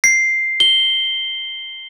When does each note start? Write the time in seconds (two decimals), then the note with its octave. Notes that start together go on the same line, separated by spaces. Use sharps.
0.04 C7
0.60 G7